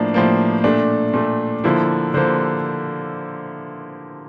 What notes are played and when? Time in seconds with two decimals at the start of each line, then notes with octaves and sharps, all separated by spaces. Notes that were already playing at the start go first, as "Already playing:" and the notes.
Already playing: A2 F3 A#3 D4
0.14 A2 F3 A#3
0.64 A#2 A3 D4
1.14 A#2 A3
1.64 D3 F3 A#3 E4
2.14 D3 F3 A#3 C5